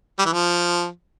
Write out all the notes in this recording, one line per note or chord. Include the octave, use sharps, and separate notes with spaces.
G3
E3
F3